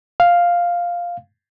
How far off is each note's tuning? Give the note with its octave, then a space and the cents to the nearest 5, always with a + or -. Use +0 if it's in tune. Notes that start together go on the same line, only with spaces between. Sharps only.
F5 +0